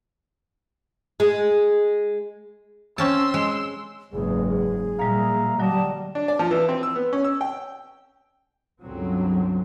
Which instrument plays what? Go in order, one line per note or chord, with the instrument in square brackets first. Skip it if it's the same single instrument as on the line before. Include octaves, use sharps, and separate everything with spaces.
[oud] G#3
[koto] C4 C#4 A5 [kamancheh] C6 E6
[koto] G#3
[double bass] F#1 G#2 [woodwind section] E2 [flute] G#4
[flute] G#4
[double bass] A#2 [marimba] F3 G3 A#3 [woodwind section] E5 F5 A#5
[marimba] D3 F#3 [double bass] G3 [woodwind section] D5 D#5 [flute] A5
[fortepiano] D4
D5
F3
E3
C4
E6
B3
C#4
E6
G5
[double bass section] C#2 G2 D3 F#3 C4